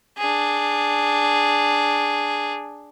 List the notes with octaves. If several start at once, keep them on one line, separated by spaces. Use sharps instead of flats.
D4 G#4